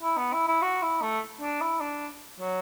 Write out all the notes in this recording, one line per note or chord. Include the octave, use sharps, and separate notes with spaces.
E4
B3
E4
E4
F#4
E4
A3
D4
E4
D4
F#3